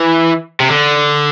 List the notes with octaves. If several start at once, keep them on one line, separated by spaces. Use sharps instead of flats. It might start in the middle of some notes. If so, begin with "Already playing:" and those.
Already playing: E3
C3
D3